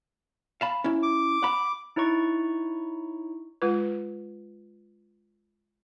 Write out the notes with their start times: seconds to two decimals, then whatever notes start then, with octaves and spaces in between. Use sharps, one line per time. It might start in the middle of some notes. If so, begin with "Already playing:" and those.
0.61 F5 A5 B5
0.84 C#4 E4
1.03 D6
1.43 F#5 B5
1.96 D#4 E4 C#5 A#5 C#6
3.62 G#3 F4 B4